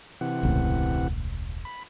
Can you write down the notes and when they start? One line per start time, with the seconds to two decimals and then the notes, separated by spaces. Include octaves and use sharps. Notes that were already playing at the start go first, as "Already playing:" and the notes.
0.21 C3 E3 F#5
0.43 E1 C#2 A2
1.65 B5